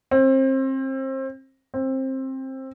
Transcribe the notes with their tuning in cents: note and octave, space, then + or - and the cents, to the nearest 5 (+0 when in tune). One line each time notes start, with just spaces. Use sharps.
C4 +30
C4 +20